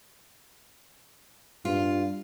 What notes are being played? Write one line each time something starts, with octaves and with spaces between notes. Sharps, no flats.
G2 F4